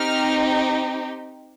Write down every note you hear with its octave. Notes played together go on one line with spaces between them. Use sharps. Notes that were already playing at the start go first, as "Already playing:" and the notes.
Already playing: C4 D#4 G4 F6